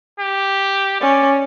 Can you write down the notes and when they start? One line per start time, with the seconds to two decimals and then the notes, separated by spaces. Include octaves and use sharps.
0.19 G4
1.01 C#4 D5